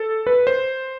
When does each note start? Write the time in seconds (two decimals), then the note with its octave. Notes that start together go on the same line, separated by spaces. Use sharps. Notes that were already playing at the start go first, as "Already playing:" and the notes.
Already playing: A4
0.27 B4
0.47 C5